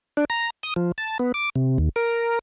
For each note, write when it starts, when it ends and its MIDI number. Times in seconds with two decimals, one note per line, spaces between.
0.17 0.25 62
0.30 0.50 82
0.63 0.74 87
0.76 0.92 53
0.98 1.18 81
1.19 1.32 59
1.34 1.50 86
1.56 1.78 48
1.78 1.89 39
1.96 2.39 70